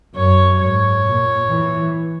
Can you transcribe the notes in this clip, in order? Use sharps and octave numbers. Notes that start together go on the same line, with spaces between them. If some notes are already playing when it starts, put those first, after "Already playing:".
F#2 C#5
G#2 C#5
A#2
E3